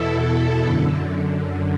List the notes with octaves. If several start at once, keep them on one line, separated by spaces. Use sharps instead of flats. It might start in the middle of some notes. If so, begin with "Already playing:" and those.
Already playing: E2 B2 E4 A4
E4
F#2 D3